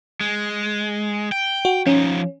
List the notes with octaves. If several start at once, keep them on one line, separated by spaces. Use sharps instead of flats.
G#3
G5
F#4
F3 C#4 D#4